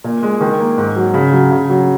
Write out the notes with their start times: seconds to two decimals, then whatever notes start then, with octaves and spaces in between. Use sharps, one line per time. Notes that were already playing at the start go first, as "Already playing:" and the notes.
0.04 A#2
0.23 G#3
0.41 D#3
0.59 A#3
0.78 G#2
0.96 F#3
1.14 C#3
1.32 F#3
1.51 C#3
1.69 F#3